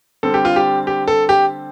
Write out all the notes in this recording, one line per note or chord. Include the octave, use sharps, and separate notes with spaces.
D3 G3 C4 A4
G4
F4
G4
G4
A4
G4